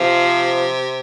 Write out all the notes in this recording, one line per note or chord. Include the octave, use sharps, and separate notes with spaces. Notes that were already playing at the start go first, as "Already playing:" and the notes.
Already playing: C3 F3